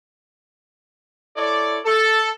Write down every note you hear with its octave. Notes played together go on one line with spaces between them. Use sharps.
E4 A4 C#5 D5
A4